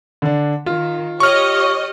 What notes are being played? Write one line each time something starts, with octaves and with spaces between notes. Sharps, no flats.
D3 D4
D#3 F4
G4 C#5 D#5 C#6 F6